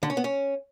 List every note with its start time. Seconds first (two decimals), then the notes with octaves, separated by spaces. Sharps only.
0.03 D3
0.10 C#4
0.17 B3
0.24 C#4